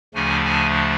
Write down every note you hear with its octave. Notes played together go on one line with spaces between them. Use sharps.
D2 C#3 F3 A3 D4 G#5
G#5